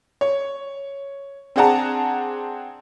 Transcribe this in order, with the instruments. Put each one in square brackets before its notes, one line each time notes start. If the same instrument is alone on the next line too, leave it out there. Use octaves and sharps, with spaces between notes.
[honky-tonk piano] C#5
C4 D4 G#4 F#5 A5 A#5